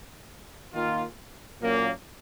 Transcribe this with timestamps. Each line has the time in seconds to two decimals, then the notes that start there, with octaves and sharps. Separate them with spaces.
0.73 D#3 A#3 F4
1.60 A#2 F#3 A#3 C#4